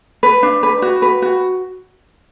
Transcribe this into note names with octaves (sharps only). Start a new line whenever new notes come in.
B4
D4
B4
F#4
B4
F#4